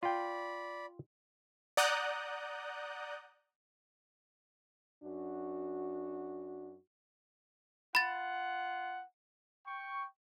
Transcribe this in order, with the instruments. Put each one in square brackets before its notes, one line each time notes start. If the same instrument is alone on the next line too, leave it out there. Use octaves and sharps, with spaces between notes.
[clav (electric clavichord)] F4 G5 [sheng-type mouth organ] D5 B5
[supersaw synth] D5 F#5 A#5 D#6 F#6 G6
[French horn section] F#2 D4 F#4
[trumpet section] F4 F#5 [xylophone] B5 A6
[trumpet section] G5 C#6